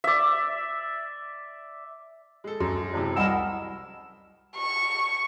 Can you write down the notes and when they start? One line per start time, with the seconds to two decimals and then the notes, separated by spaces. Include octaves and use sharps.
0.04 D5 E5
2.44 G#3 A4
2.60 F#2 F#4
2.94 C3 E3 G#3 C5 A5
3.17 C2 D#5 F#5 G#5 B5 E6 F6
4.57 C#6